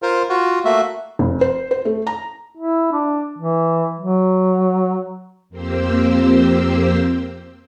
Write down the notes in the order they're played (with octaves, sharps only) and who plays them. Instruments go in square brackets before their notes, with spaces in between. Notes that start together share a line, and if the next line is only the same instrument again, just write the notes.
[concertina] F4 A#4 C5
F4 F#4
A3 A#3 F#4 E5
[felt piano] F1
C5
C5
A3
A#5
[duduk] E4
D4
E3
F#3
[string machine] F2 A#3 C4 G4 C5 E6